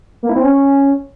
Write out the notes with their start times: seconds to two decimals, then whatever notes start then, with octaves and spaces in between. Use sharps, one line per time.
0.23 A#3
0.29 E4
0.36 C4
0.43 C#4